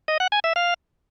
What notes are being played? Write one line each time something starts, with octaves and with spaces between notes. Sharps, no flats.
D#5
F#5
G#5
E5
F5